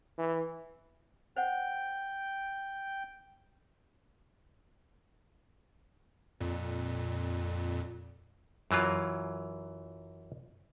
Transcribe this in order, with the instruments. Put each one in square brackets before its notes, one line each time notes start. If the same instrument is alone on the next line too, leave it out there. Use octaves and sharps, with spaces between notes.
[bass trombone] E3
[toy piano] C5 F#5 [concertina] G5
[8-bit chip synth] F2 A#2
[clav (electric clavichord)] F#2 E3 F#3 F4